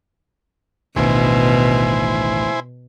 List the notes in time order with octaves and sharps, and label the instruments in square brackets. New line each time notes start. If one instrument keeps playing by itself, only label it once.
[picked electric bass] A1 D2 D#3 [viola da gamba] B2 [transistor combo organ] E4 C5 G#5